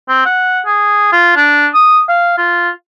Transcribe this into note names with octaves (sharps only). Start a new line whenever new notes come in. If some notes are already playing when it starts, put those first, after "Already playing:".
C4
F#5
G#4
F4
D4
D#6
F5
F4